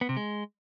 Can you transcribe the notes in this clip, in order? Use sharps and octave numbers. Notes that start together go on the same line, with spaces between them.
B3
C3
G#3